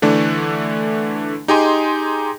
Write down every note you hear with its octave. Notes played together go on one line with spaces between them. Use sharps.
D3 E3 A3 D4
D#4 G4 G#4 D#5 G#5 C6